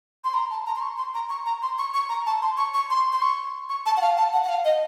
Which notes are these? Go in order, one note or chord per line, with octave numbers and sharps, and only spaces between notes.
C6
A#5
A5
A#5
C6
C#6
C6
A#5
C#6
A#5
C6
C#6
C#6
A#5
A5
C6
C#6
C#6
C6
C6
C#6
C#6
A5
F#5
F5
A5
F#5
F#5
F5
D#5